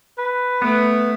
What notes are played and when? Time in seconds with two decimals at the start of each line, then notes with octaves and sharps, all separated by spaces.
0.18 B4
0.62 A3 B3